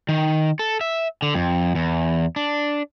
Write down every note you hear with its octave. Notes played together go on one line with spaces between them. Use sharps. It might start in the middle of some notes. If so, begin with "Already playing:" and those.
D#3
A4
E5
D3
F2
E2
D4